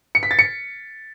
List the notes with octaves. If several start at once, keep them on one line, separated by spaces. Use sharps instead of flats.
C#7
B6
A6
C#7